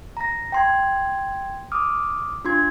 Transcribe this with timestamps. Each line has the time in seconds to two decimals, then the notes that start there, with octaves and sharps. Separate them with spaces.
0.17 A#5 A#6
0.52 G5 C6 G#6
1.72 D6 D#6 F6
2.45 D4 F4 C6 G#6